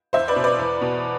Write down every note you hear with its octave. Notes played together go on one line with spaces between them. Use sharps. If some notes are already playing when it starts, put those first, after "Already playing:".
E2 C5 E5
B4 D5
B2
B4 D5
E2
B2